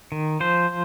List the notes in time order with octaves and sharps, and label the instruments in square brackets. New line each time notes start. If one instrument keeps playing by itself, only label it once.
[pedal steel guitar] D#3
F3 C5